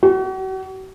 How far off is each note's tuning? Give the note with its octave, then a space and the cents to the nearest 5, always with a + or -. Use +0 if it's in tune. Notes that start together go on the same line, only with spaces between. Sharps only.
F#4 +40